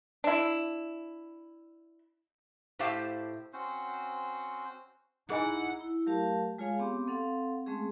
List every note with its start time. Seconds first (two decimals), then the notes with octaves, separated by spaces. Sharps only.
0.24 D4 E4
2.79 A2 A3 G4 C5 F5 A5
3.53 C4 C#4 F#4 C5
5.30 D#4 E4 G#4 D#5 F#5 G#5
5.81 E4
6.06 F#3 A3 G4 A#4 F5 A5
6.58 G#3 F4 G#4 C#5 F5 G#5
6.79 B3 C4 G4 D6
7.08 C4 A4 F5 F#5
7.67 G#3 A3 C4 C#4 G#4